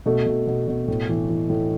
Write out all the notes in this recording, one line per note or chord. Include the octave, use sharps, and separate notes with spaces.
B2 A3
B2
B2
B2
A2
E3
E3
A2